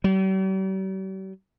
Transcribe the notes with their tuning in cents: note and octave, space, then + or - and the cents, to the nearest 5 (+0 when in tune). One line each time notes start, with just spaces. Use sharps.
G3 -45